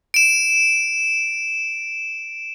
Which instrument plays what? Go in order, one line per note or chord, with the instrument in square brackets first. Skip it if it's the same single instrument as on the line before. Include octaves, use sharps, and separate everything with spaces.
[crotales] D7 E7